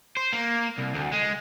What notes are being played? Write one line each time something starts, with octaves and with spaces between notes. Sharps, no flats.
C5
A#3
C2
D2
G#3